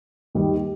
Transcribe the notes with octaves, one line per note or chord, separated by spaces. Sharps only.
D#2 D#3 G3